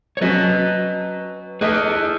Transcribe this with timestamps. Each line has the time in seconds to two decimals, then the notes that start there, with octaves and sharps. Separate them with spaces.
0.17 C#5
0.21 F#3 C#4 F#4 B4 D#5
1.61 A3 D#4 G#4 A4 B4 D#5